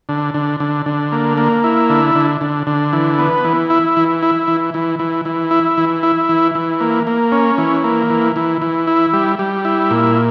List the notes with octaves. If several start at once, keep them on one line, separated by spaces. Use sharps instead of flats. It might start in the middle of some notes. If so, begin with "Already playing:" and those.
D3
D3
D3
D3
A#3
A#3
E4
D3
D3
D3
D3
E3
B3
E3
E4
E3
E4
E3
E3
E3
E3
E4
E3
E4
E3
E3
A#3
A#3
C#4
E3
A#3
E3
E3
E3
E4
G3
G3
E4
A#2